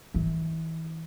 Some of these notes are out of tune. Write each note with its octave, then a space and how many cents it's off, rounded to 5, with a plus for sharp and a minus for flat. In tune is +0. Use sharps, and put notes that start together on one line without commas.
E3 -30